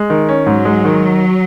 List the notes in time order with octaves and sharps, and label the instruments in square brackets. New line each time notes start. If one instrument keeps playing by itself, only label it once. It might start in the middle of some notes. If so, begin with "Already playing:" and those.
Already playing: [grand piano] G#3
D#3
C#4
[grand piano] G#2 [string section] F#3
[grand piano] G#3
D#3